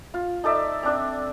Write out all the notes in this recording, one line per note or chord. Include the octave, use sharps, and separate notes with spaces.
F4
D#4 A4 D5 E5
C4 D4 D5